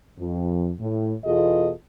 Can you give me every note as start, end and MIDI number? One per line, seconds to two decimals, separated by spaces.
0.20 0.72 41
0.80 1.14 45
1.25 1.71 40
1.25 1.71 47
1.25 1.71 65
1.25 1.71 68
1.25 1.71 69
1.25 1.71 75